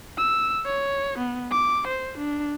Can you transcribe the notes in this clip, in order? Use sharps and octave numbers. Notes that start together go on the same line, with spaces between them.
E6
C#5
B3
D6
C5
D4